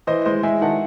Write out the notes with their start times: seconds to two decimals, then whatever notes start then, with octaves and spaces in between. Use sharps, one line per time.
0.07 E3 C5 D#5
0.25 G#3 C5 D#5
0.43 G#3 E5 G#5
0.61 D#3 F#5 A5